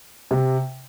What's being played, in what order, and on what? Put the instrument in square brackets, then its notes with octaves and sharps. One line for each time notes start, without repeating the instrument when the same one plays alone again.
[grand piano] C3